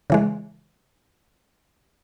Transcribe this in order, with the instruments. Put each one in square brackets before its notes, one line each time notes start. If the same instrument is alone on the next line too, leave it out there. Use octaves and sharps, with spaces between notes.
[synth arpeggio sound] C#3 E3 G#3